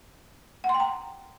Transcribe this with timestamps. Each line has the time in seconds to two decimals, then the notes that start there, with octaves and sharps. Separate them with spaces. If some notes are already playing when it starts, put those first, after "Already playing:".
0.64 F#5
0.69 C6
0.75 G5
0.80 A#5